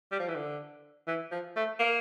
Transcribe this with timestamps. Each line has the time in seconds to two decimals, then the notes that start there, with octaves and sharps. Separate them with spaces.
0.12 G3
0.20 F3
0.28 E3
0.36 D3
1.07 E3
1.31 F3
1.56 A3
1.79 A#3